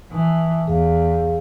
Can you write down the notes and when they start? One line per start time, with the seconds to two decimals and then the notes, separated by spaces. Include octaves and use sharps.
0.13 E3 E5 A5 D#6
0.67 E2 G#4 F5